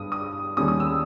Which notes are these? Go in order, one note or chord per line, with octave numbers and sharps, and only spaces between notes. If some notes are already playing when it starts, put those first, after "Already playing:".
Already playing: G2 G3 D#6
D#6
D#2 D#3 G3 C#4 D#6
D#6
E6